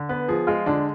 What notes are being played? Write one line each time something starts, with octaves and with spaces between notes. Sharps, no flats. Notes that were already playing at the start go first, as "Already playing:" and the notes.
Already playing: D3
B3 B4
F3 G#4
G#3 F4
D3 D4